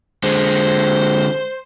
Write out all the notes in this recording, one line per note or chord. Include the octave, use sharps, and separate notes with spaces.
D3 G#3 C5